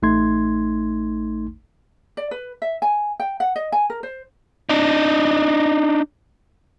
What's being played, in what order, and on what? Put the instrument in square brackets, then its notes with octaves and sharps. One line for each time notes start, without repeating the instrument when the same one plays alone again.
[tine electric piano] A1 A3 D#4 C6 G#6
[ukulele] D5
B4
E5
G#5
G5
F#5
D#5
G#5
A#4
C5
[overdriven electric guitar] D4 D#4